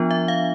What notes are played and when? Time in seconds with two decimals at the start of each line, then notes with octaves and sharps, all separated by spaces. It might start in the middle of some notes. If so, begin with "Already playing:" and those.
Already playing: F3 B3 D4 F4
0.11 E5
0.28 F5